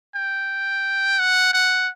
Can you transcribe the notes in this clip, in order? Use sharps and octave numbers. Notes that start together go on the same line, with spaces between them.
G5
F#5
F#5